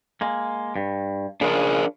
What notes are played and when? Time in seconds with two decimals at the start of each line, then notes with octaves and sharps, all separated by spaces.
0.21 G#3 A#3
0.76 G2
1.41 C#3 F3 D4 G#4 A#4